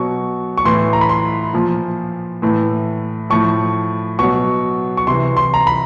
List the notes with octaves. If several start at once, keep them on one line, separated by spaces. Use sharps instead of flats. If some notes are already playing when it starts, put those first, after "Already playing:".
Already playing: B2 F#3 C#6
C#6
A2 E3 C6
A#5
B5
C6
A#2 F3
A2 E3
A2 F3 C#6
B2 F#3 C#6
C#6
C3 E3 C6
C6
A#5
B5